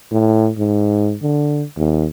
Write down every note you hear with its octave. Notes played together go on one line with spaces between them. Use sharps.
A2
G#2
D3
D#2